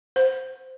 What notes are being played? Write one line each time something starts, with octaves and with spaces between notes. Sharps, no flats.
C5